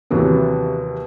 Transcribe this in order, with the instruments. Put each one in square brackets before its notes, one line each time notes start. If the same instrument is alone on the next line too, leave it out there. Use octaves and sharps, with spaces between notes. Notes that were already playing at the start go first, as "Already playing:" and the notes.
[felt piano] D#2 C3 E3 F#3 B3